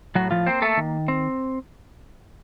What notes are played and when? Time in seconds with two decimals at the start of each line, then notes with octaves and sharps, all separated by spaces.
0.15 A2 F#3 F#4
0.31 F3 F4
0.46 A#3 C4 C5
0.62 A3 A4
0.77 D#3
1.08 C4